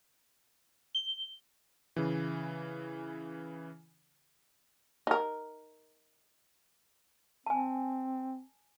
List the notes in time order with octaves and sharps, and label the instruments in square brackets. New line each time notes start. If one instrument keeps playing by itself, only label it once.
[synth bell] G7
[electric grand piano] C#3 E3
[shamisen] D#4 A#4
[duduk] C4 [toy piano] G#5 A5